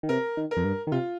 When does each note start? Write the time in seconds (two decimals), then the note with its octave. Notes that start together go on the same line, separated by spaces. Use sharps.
0.03 D#3
0.09 C3 A#4
0.37 D#3
0.51 A#4
0.57 F2
0.64 G2
0.87 D#3
0.92 C3 F4